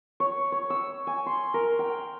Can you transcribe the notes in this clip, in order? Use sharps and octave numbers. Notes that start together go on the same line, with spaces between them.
C#5
C#5
E6
G#5
C6
A#4
G5